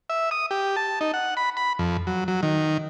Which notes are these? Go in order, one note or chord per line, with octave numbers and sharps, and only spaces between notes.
E5
D#6
G4
A5
D#4
F#5
B5
B5
F2
F#3
F#3
D#3